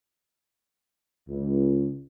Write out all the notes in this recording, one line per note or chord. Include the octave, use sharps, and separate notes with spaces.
C#2